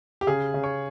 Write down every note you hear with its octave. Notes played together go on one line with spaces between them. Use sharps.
G4
C#3 G#4
C#3
C#5